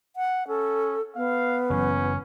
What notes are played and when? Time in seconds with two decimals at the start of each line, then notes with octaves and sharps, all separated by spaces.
0.16 F#5
0.48 C#4 A4
1.16 B3 F5
1.70 F#1 F#2 E3 C#4